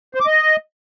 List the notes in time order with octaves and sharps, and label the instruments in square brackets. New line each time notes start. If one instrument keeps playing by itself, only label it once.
[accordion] C5
D6
D#5